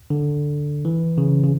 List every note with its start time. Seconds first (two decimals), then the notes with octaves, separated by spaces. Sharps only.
0.10 D3
0.85 E3
1.18 C#3
1.43 C#3